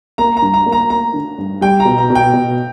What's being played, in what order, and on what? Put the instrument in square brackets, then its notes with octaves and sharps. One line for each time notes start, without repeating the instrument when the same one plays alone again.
[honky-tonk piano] A#3 [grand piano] A#5
[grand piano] A#5
[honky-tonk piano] G2
[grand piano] A#5
[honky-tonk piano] A#3
[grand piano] A#5
[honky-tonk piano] A#3 [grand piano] A#5
[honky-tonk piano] D3
G2
[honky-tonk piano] G3 [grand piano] G5
[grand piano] A#5
[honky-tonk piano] B2
[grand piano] A#5
[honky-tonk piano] B2
[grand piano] G5
[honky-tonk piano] B2